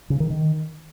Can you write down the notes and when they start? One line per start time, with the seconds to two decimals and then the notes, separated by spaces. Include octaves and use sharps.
0.10 C#3
0.20 D#3
0.30 D#3